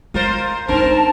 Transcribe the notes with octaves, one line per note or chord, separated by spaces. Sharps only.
G#3 F4 A#4 C5
C4 D4 D#4 A#4 C5 A5